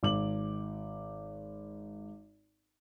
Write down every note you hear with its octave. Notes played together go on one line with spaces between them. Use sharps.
G#1 D6 F#7